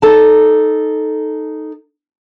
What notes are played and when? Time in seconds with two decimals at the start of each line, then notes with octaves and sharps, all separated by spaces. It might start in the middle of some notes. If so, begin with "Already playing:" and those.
0.02 D#4 A4 A5